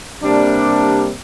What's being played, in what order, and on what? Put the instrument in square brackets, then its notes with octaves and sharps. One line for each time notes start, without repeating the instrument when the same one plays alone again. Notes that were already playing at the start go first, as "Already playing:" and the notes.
[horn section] C3 G3 A#3 D4